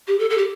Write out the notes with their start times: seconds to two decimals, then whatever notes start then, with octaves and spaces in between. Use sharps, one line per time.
0.08 G4
0.19 A4
0.30 A4
0.37 G4